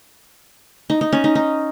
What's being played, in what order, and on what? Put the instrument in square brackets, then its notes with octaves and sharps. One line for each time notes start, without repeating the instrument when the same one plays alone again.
[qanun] D#4
D#4
C#4
D#4
D#4